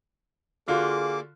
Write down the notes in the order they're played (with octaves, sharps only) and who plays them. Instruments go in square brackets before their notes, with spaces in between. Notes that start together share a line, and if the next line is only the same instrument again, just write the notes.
[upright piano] D3 F4 F#4 [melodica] A#3 D6 [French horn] G#4